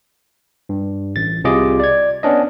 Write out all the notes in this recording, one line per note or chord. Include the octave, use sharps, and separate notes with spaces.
G2
A1 A6
C2 C3 F4 G#4 D#5 D6
D5 G#6
B3 C#4 D4 D#5